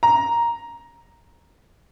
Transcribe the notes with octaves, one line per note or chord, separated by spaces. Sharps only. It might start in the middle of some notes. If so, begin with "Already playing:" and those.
A#5